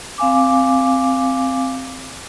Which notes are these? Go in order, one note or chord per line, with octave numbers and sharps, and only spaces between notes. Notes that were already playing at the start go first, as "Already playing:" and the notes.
C4 F5 G#5 D6